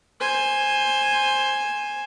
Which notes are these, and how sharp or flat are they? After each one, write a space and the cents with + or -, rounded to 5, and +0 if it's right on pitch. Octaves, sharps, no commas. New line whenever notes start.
C5 +15 G#5 +0